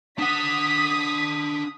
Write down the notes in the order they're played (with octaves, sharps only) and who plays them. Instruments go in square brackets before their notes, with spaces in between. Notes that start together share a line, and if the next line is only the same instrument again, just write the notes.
[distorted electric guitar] D4 F#5 [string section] D#6 B6